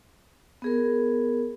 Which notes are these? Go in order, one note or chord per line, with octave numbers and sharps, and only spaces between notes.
B3 G#4 A#4